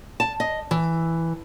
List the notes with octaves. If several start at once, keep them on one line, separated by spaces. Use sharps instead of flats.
A5
D#5
E3